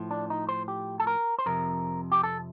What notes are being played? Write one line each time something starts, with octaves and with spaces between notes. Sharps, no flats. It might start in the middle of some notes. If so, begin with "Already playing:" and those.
Already playing: A2 F3
D4
D#4
C5
G4
A4
A#4
C5
F2 C3 F3 A#4
G4
A4